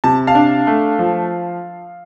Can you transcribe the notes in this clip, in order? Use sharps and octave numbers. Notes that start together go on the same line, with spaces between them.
C3 A5
F5 A5
D4
A3
F3